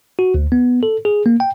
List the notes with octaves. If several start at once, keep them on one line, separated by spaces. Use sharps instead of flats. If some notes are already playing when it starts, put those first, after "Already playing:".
F#4
D2
B3
A4
G#4
A#3
G5